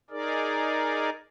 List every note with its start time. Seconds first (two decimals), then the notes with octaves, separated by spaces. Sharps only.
0.10 D#4 G#4 A#4 D5